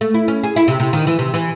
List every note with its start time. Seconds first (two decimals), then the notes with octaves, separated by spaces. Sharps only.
0.01 A3
0.14 E4
0.28 C#4
0.43 G#4
0.56 E4
0.68 C3
0.80 C3
0.93 D#3
1.07 E3
1.19 C3
1.34 E3